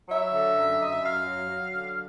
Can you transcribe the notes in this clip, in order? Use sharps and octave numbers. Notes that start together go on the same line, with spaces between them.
F#3 E5
D3
F#2
F#2 D#5
E5
F#2 F5
F#3
F#3
D3